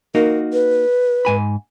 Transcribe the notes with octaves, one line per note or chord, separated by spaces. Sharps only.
A#3 D#4 F#4 A#4
B4
G#2 G#5 B5